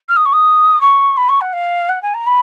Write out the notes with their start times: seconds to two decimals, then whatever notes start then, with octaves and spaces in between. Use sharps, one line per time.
0.09 F6
0.16 D#6
0.25 C#6
0.33 D#6
0.81 C#6
1.17 B5
1.29 C#6
1.41 F#5
1.53 F5
1.89 F#5
2.02 G#5
2.14 A#5
2.26 B5